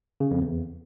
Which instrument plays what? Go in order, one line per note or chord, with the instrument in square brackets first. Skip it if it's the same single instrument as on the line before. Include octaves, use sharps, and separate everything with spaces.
[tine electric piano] C#3
F2
E2